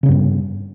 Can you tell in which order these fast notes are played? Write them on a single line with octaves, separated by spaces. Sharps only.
C#3 C#4 G2 B3